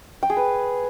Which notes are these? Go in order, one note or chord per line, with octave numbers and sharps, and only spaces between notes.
G5
G#4
B4